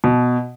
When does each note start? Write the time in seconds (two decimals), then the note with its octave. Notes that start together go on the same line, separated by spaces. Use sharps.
0.04 B2